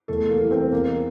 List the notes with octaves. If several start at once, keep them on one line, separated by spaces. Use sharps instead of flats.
E2 A3 A4
A#3 A#4
E3 G3
C4 C5
E2 A#3 A#4